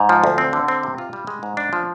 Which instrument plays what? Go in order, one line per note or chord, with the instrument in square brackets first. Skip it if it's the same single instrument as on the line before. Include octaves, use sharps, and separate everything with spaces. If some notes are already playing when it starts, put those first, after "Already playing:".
Already playing: [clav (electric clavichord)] G#2
F3
D2
C4
D3
C4
C3
F4
G3
G#3
G#2
D4
F3